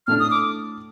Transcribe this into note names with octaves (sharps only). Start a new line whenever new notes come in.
A2 A3 D4 F6
D#6
D6